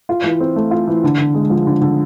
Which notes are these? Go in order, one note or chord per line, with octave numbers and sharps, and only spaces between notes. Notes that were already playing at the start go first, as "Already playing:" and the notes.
F4
E3
C4
A3
F4
E3
D3
D3
G#3
F3
D3
D3